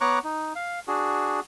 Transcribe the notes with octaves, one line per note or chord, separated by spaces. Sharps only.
B3 C#5 A#5 C#6 D6 F#6
D#4
F5
D4 F#4 G#4